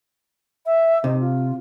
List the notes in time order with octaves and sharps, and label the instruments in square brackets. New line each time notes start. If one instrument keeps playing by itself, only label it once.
[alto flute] E5
[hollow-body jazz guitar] C3 [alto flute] D#4
[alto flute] F4